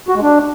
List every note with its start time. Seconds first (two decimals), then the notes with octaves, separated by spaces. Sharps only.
0.09 F#4
0.15 G#3
0.22 D4